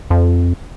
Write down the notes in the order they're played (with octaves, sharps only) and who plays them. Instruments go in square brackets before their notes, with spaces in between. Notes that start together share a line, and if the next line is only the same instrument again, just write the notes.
[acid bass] F2